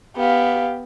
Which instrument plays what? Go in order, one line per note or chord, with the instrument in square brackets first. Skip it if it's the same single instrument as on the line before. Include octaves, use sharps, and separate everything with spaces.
[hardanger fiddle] B3 [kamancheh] G4 F5